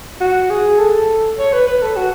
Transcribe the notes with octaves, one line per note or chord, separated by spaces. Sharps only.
F#4
G#4
A4
C#5
B4
B4
A4
F#4